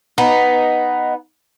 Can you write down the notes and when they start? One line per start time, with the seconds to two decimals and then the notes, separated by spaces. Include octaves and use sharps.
0.18 B3 D#4